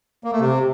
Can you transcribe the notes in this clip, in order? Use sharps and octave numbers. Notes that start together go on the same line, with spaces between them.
A#3
A3
C3